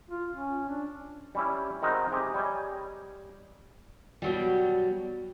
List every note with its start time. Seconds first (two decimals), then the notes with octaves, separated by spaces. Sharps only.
0.10 F4
0.32 C#4
0.69 D4
1.35 G3 C#4 E4
1.82 D#3 G#3 C4 D#4 F#4 A#4
2.12 C3 G4 G#4
2.35 G3 C#5 D#5 G5 G#5
4.22 B2 F#3 G3